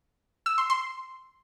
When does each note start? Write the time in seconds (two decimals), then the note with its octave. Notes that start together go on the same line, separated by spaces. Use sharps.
0.46 E6
0.58 C6
0.70 C6